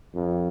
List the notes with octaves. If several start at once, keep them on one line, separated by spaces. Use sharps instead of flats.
F2